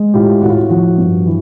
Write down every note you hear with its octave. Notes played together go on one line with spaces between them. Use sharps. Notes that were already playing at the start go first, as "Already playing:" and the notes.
Already playing: G#3
A2 F4 G4
A2 F#4
F4
F#4
F3 F#4
G2
E3